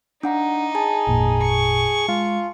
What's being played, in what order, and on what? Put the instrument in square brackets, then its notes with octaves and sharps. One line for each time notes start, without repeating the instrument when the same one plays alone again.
[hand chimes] D4 F#5 A#5 [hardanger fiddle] D#4 [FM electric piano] F5 D6
[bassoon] G#4 [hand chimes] A5
[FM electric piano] G#1 F2 A#2
[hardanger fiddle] C#6
[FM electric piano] G#3 [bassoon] F4